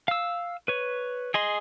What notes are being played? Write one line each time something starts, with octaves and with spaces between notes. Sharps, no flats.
F5 E6
B4 C#5
G#4 D#5 C6